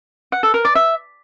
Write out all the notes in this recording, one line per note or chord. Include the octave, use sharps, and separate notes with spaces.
F#5
A4
A#4
D5
E5